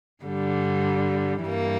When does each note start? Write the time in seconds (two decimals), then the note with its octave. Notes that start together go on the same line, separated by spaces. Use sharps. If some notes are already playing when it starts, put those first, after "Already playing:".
0.23 G2 D3 G3
1.45 G2 E3 G3 A#3